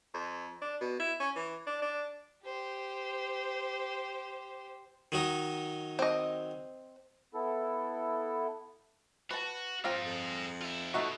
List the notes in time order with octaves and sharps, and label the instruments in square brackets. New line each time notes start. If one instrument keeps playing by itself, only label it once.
[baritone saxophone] F2
D4
B2
E4
C#4
E3
D4
D4
[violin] G4 C5
[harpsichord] D#3 F#3 D#4
[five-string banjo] C4 D#5
[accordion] B3 E4 A4
[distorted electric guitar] F#4 [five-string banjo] B4 A5
[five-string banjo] F3 C4 F5 [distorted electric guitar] G#4 A#5
[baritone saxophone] F2
[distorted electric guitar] F4 E5
[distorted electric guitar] B2 [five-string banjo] A3 D#4 F#4